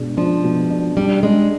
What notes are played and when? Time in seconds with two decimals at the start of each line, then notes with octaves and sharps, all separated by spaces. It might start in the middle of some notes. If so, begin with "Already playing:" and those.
Already playing: B2 G#3 D4
0.17 F3 D4
0.44 B2
0.70 D4
0.97 G3 D4
1.23 G#3 D4